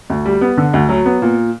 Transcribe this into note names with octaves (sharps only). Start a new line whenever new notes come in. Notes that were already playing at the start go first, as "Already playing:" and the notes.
D2
G3
B3
D3
D2
F#3
B3
A#2